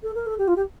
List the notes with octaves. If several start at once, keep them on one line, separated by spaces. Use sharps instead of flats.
A4
A#4
A4
G4
F4
G4